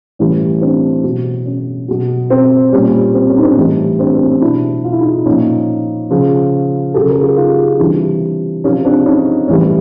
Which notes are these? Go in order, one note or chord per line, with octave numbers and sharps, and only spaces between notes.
A2 E3 G3 C#4
C4 D4
B2 F#3
C#4
B2 F#3
C4
A#2 G3 C#4
C4
C#4
D#4
C4 D4
A2 E3 G3
C4 D4
C4 D4
C#4
B2 F#3 D4 E4
F4
E4
D#4 F4
A#2 F3 C#4 D#4
C#3 F3
C#3 F#3 G4 A4
G#4 A#4
F4 G4
D#4 F4
F4
C3 E3 G3 D4 E4
C3 F3 C#4 D#4
C4 D4
C#4 D#4
A2 E3 G3 C#4